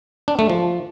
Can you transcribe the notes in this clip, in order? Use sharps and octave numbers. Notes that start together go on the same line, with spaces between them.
D4
A3
F3